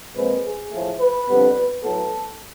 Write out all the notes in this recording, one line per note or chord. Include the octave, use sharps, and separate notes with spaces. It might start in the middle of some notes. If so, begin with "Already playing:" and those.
A#2 F3 G#3 C4 B4
G#4
A2 F3 A3
B4
F2 D3 G3 B3
A2 F#3 B3 A4